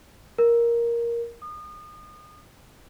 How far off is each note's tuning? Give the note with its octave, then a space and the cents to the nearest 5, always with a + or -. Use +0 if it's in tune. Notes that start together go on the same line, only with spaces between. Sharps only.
A#4 +5
D#6 -35